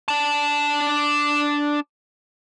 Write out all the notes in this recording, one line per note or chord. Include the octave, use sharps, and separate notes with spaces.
D4 A5